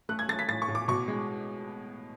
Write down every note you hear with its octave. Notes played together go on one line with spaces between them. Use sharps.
A3 F#6
G#6
A3 A6
B6
A2 A6
C#6
A2
D6
B2 C#6
G#3